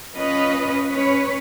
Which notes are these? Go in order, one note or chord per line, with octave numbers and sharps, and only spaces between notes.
C#4 F4 B4 D#5
C#4 B4 C#5